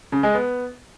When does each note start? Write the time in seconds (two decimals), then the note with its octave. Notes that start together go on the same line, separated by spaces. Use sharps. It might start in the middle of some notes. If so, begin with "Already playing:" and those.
0.12 C#3
0.23 G#3
0.34 B3